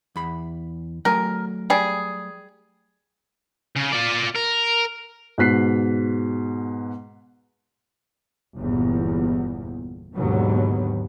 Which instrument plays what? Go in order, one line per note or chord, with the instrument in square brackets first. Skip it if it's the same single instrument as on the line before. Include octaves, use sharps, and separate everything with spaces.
[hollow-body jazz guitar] E2 B5
[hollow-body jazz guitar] F#3 A3 G#5 [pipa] A#4
[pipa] G3 G#4
[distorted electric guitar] C#3
F4 D5
A#4
[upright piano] G#2 B2 F#6 B6 C7
[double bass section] G1 E2 A#2
D#2 G#2 B2 D3 F#3 B3